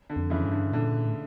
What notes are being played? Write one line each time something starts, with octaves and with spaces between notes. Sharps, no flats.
D3
F2
C#3 E3
G2
D3
A#2 D3
A2